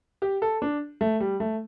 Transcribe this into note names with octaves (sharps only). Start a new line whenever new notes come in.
G4
A4
D4
A3
G3
A3